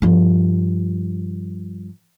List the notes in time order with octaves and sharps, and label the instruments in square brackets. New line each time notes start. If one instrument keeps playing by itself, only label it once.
[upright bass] G2 F3